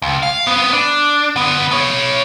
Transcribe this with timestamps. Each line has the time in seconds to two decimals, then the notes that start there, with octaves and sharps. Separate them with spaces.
0.02 C#2
0.23 F5
0.47 B3 C4
0.73 D4
1.36 D3 B3
1.71 B3 C#5